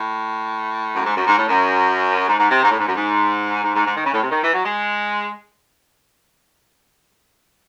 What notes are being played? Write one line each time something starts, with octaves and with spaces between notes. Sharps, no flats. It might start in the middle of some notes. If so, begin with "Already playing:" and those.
Already playing: A2
F#2
G#2
F#2
G#2
A2
F#2
G#2
G#2
C3
G#2
A2
G#2
F#2
G#2
G#2
G#2
G#2
D#3
C#3
A2
C3
D#3
E3
F#3
G#3